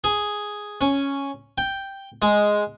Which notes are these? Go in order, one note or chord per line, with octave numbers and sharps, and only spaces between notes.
G#4
C#4
G5
G#3